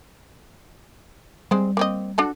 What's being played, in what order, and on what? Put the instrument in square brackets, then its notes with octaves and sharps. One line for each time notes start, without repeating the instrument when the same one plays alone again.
[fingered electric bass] G3 [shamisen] G#3 C4 C5
[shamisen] A#3 C4 D#5
D4 F#4 A4